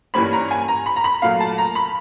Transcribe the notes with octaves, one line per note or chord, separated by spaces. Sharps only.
G2 E3 G3 A#3 C#4 B5
A#5
G#5
A#5
B5
A#5
B5
A#2 F#3 A3 F5
A5
A#5
B5